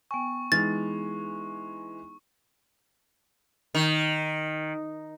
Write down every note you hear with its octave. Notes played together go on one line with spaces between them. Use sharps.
B3 G5 G#5 C#6
E3 G#3 D#4 G#4 F6 A6
D#3